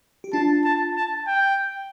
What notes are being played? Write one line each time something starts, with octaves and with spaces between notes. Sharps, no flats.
G4
D4 F4 A5
A5
A5
G5